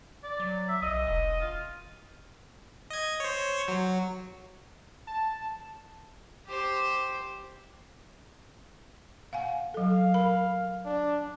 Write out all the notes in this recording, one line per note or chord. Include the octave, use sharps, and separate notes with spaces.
D5
F#3
E5
B1 D#5 D#6
E1
F4
D#5 G#6
C5 C#5
F#3
A5
G4 C5
F5 F#5 G#5
F#3 A4 F5
A#4 B5
D4